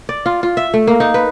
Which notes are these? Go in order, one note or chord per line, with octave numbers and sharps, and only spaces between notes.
D5
F4
F4
E5
A3
A#3
D#4
B4